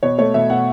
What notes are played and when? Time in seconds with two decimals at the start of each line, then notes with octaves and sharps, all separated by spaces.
0.03 B2 C#5
0.18 A3 C#5
0.34 B2 E5
0.50 B2 F#5